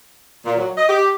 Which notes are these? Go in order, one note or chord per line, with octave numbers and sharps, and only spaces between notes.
A#2
F#3
D#5
G4